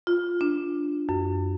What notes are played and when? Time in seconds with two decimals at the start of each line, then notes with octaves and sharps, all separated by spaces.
0.07 F4
0.41 D4
1.09 F#2